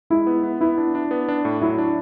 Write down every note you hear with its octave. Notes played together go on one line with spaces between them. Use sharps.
G#3 E4
B3
B3
B3 E4
D4
D4
B3
D4
A2
F#3 E4
D4